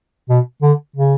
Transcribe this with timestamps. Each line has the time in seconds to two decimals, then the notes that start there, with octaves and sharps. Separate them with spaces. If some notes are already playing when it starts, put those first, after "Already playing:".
0.29 B2
0.62 D3
0.96 C#3